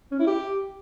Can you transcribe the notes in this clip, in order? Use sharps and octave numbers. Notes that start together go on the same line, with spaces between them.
C#4
E4
G4